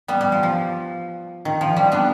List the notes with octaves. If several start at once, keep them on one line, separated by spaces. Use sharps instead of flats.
G3 B3
G3
F3
F3
D#3
F3
G3
B3 D4